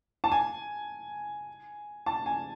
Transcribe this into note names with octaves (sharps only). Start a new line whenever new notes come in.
A5
G#5
A5
G#5